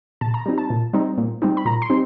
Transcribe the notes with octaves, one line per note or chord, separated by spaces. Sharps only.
A#2 A5
A#5
G3 C4 D#4
A5
A#2
G3 C4 D#4
A#2
G3 C4 D#4
B5
A#2 A#5
C6
G3 C4 D#4